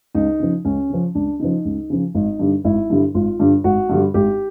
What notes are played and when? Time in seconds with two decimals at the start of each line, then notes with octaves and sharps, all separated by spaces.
0.15 C#2 D#4
0.40 C#3 F3
0.65 C#2 C#4
0.90 C#3 F3
1.15 C#2 D4
1.40 C#3 F3 D#4
1.65 C#2
1.90 C#3 F3
2.15 G#1 D#4
2.39 G2 D3 G3
2.64 G#1 E4
2.90 G2 D3 G3
3.14 G#1 F4
3.40 G2 D3 G3
3.64 G#1 F#4
3.89 G2 D3 G3
4.14 G#1 G4